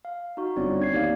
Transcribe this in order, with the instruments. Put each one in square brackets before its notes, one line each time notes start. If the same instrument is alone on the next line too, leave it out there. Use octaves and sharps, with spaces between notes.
[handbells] F5
D#4 F#4
[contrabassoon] G1 [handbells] C4 C#5 D5
[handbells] C#5 G#6 C7
[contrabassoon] D#2 [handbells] D5 F5